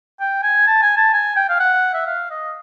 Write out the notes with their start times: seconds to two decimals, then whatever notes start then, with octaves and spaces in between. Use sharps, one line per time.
0.20 G5
0.43 G#5
0.67 A5
0.83 G#5
0.97 A5
1.14 G#5
1.36 G5
1.49 F5
1.60 F#5
1.94 E5
2.06 F5
2.31 D#5